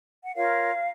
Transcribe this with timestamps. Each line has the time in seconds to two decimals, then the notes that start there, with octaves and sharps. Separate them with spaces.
0.24 F#5
0.36 F4 A#4 C#5 F5